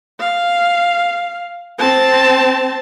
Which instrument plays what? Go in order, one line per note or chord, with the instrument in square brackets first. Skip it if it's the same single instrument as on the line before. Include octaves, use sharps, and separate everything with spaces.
[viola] F5
C4 A5